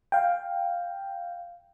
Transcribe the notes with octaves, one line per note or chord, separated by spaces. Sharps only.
F5 G5